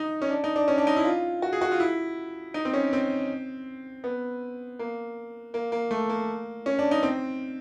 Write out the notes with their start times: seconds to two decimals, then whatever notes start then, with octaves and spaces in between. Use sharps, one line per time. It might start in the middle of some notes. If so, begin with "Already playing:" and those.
Already playing: D#4
0.22 C#4
0.31 D4
0.44 D#4
0.56 D4
0.68 C#4
0.78 D4
0.87 D#4
0.97 E4
1.05 F4
1.42 F#4
1.53 G#4
1.62 F#4
1.71 F4
1.80 E4
2.54 D#4
2.65 C4
2.74 C#4
2.93 C4
4.04 B3
4.79 A#3
5.54 A#3
5.72 A#3
5.91 A3
6.10 A#3
6.66 C#4
6.79 D4
6.91 D#4
7.03 C4